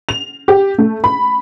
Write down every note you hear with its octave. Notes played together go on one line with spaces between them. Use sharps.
F7
G4
A3
B5